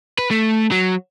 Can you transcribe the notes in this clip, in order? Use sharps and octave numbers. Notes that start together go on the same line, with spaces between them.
B4
A3
F#3